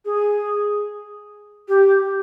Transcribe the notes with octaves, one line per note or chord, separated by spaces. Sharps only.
G#4
G4